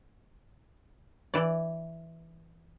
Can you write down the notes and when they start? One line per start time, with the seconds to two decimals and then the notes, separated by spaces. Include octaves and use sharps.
1.34 E3 D5